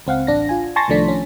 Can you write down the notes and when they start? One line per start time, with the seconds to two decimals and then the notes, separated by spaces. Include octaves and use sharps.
0.07 C#2 C4 F5 F#5
0.27 A1 D4 A#6
0.49 F4 G#5
0.76 G#5 A5 C6 C#6 A6 A#6
0.88 C2 D#3 F3 A3 D4 B6
1.08 C#4